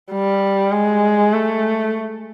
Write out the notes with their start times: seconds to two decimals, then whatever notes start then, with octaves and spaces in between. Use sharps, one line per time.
0.11 G3
0.72 G#3
1.33 A3